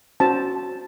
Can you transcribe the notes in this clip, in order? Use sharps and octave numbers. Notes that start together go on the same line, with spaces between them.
C#4 F#4 C5 A5